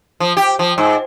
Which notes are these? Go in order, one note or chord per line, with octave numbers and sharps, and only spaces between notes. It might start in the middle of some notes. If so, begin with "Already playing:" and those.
F3
G4
F3
G#2